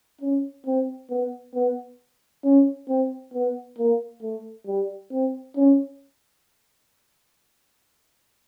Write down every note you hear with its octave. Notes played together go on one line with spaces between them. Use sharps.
C#4
C4
B3
B3
C#4
C4
B3
A#3
A3
G3
C4
C#4